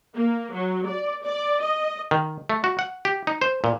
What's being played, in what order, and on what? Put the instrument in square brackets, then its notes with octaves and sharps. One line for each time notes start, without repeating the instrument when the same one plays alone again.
[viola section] A#3
F#3
D5
D5
D#5
[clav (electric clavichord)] D#3
A3
F#4
F#5
G4
D#4
C5
A#2